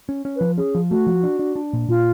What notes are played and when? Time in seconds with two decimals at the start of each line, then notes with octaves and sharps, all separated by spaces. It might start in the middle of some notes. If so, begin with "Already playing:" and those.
0.09 C#4
0.25 C#4
0.36 F3 B4
0.57 C#4 G#4
0.75 F3
0.90 A3 F#4
1.07 F3
1.23 D4
1.39 D4
1.56 D4
1.73 A#2
1.88 A#2 F4